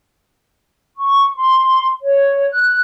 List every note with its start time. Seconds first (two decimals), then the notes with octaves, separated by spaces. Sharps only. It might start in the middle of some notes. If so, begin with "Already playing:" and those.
0.97 C#6
1.36 C6
2.01 C#5
2.51 F#6